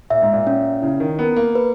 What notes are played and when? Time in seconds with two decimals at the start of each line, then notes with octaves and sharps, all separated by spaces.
0.10 A#2 E5
0.22 G#2
0.33 A#2
0.47 C#4
0.82 C#3 E4
1.00 D#3
1.19 B3 A#4
1.37 A#3
1.55 B4